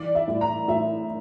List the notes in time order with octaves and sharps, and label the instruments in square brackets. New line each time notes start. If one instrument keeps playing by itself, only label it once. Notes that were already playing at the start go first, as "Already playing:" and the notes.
Already playing: [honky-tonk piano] E3 D5
E5
A2
A#5
A2 E5